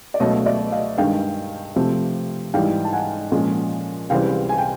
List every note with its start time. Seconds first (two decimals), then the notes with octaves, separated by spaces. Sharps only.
0.14 D5
0.20 C#2 B2 F#3 A3 C#5 D#5
0.46 D5 E5
0.72 D#5 F5
0.98 G2 D#3 G#3 F5 G5
1.76 C3 F3 A3 C4
2.54 G#2 E3 G3 F5 G5
2.85 A5
2.93 F#5 G#5
3.32 A#2 F3 G#3 C#4
4.10 C#2 C3 E3 G3 C4 F5 G5
4.49 G#5
4.58 G5